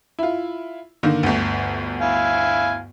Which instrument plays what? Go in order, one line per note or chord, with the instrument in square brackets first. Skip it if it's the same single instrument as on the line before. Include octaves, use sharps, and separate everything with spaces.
[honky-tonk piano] E4 F4
D3 D#3 A#3
G1 D2
[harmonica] E4 F5 G#5